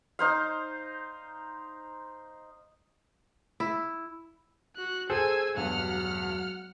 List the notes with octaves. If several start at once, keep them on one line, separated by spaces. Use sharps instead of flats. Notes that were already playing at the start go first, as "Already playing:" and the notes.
D#4 C5 F5
E4
F#4 F#6
G#4 A4 C5 G#5 E6
E1 G2 F#3 F#5 F6